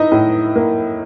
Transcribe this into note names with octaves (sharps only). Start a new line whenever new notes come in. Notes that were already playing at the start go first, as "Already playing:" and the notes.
Already playing: D#4 E4 D#5
A2
A#3